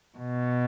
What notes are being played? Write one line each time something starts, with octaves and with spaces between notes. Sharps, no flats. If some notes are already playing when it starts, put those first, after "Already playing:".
B2